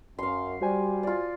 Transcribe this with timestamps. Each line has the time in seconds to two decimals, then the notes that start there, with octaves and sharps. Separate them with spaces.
0.19 F#2 F5 C6
0.61 G3 F#4 C5 G#5
1.03 F4 D5